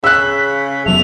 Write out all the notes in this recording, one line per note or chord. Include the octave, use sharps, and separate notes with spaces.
C#3 E6 F#6 B6
F1 F#3 A3 B3 F7